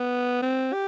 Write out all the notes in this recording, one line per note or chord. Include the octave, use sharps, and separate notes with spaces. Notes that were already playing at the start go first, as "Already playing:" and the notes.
Already playing: B3
C4
G4